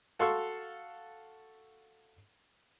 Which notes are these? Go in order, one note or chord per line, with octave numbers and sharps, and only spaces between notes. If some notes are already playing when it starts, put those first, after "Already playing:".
F#4 A4 F5 C6 C#6 E6